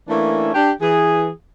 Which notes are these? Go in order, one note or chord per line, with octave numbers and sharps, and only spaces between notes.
E3 A3 A#3 C#4 D4 E4
D4 G4
E3 G#4